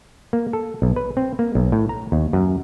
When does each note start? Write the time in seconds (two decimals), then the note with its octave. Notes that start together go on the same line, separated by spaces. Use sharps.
0.33 A#3
0.53 A4
0.82 B1
0.96 B4
1.17 C4
1.39 A#3
1.55 B1
1.72 A2
1.89 A#5
2.12 D#2
2.33 F#2